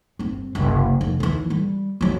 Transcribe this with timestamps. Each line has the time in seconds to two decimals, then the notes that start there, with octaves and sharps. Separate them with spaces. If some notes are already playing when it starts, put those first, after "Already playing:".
0.19 G1 C4
0.55 F#1 C2
1.01 F1 F2
1.20 D#2 E3
1.50 G3
2.01 F2 F#3